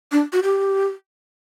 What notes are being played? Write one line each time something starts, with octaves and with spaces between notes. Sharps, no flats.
D4
F#4
G4